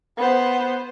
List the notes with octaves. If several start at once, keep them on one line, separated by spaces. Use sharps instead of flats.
B3 C5